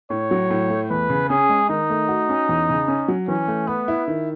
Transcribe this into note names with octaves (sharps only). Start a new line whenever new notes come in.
A2 C#5
F#3
A2
A3
E2 B4
C#3
C#4 G#4
G#3
D#3 D#4
A3
F#4
C#4
E2
C#3
C#4
F#3
E3 C#4
A3
B3 B4
E4
D#3